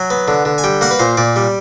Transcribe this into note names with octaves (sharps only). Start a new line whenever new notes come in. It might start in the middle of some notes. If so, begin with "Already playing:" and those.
Already playing: F#3 G#5
B3
D3
D3
G#5
G3 G5
A#3 F#5
B4
A#2 C5
A#2 D5
G3